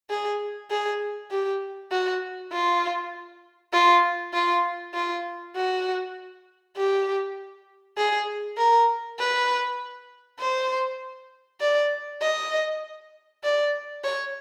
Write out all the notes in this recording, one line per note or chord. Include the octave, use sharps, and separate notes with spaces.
G#4
G#4
G4
F#4
F4
F4
F4
F4
F#4
G4
G#4
A#4
B4
C5
D5
D#5
D5
C#5